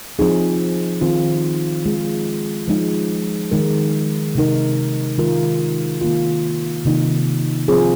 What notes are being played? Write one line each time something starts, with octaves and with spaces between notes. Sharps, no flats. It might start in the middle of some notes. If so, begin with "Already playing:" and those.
F3 C4 D#4 G#4
D#3 C4 F4
G#3 F4 G#4
F3 G#3 D#4
D#3 G#3 D#4 A#4
C3 G#3 D#4 A#4
D#3 G#3 F4 A#4
D#3 A#3 F4
C3 D#3 A#3 D#4
F3 C4 F4 G#4